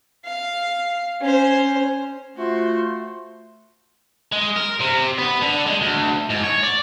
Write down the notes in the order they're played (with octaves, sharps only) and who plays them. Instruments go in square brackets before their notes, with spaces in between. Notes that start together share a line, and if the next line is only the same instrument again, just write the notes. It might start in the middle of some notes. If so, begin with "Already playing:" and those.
[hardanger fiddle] F5
C#4 C5
[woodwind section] A3 [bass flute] F4 [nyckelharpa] F#4 C5
[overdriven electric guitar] G#3
A#4
C3
B3
D3
G#3
D2
G#2
C#5
D5